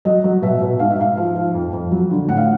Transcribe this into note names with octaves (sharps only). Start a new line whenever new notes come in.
F#3 D#5
F#3
B2 E5
B2
G#2 F5
E5
G#2 F5
F3
F3
F2
F2
F#3
D3
A2 F#5
F5